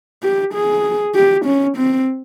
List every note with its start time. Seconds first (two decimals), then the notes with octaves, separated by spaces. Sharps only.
0.23 G4
0.54 G#4
1.15 G4
1.46 C#4
1.77 C4